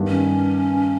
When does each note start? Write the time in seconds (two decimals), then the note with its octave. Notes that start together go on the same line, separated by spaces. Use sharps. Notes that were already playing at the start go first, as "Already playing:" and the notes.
Already playing: G2 D#3 G3 B3
0.08 C#4